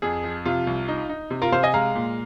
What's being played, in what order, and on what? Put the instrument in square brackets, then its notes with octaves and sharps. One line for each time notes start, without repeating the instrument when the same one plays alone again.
[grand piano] F2 G#4
F3
C3 F4
C2
D#4
D#4
C3
F4 A#4
C3 C5 F5
D#5 G#5
G#3 F5 A#5
A#2